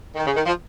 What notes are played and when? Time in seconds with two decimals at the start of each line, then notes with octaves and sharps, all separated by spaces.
0.15 D#3
0.26 C#3
0.35 D#3
0.45 F3